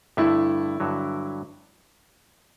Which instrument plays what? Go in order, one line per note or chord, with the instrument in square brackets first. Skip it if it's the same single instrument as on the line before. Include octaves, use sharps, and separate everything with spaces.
[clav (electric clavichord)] G2 D3 A3 [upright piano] E4
[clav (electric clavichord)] G2 D3 F#3